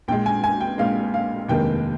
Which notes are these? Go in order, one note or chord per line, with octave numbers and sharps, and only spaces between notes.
A#1 A#2 G#3 G5
G#5
G#5
G5
A#1 A#2 G#3 F5
F5
F1 D#2 D#3 G#3 G5